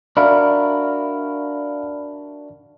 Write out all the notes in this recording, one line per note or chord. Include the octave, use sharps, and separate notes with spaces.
D4 F#4 A#4 D5 E5 F5 B5 C#6